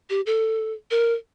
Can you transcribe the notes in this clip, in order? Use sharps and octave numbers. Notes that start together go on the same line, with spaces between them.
G4
A4
A#4